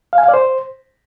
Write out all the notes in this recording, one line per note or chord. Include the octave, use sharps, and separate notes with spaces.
F5
G#5
F5
D5
C5